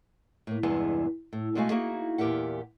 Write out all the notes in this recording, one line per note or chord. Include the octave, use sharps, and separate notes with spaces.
A2 A#3
E2 G2 C3 E3 G#3 B3
A2
B2 G#3 A3 F#4 F5 G#5
A#3 D#4 E4 F#4 G#4
E2 A#2 G4 A#4 E5 F#5